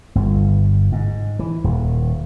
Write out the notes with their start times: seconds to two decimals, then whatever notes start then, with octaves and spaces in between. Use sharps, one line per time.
0.15 G1
0.92 G#2
1.39 E3
1.64 D#1